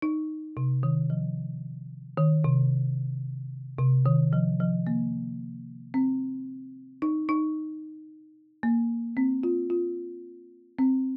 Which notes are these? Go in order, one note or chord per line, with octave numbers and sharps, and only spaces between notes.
D#4
C3
D#3
F3
D#3
C3
C3
D#3
F3
F3
A#3
C4
D#4
D#4
A#3
C4
F4
F4
C4